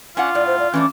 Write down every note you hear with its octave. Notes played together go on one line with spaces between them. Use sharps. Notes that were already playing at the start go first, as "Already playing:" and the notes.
C#4 D4 F4 F#5
A2 D5
C5
D5
E3 A3 C#4 D4